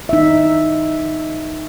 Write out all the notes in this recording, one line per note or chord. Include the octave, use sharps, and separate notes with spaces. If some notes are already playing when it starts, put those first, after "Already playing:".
D#4 E5